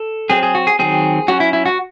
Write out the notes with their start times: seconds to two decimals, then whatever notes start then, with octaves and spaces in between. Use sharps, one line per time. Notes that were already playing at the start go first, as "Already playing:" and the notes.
Already playing: A4
0.30 F#3 C4 G#4
0.43 G#4
0.55 F#4
0.67 G#4
0.79 D#3 F#3 C4 G#4
1.28 F#3 C#4 F#4
1.40 E4
1.53 E4
1.66 F#4